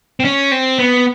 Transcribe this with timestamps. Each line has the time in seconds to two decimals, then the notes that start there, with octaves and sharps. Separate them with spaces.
0.20 C4
0.25 C#4
0.52 C4
0.79 B3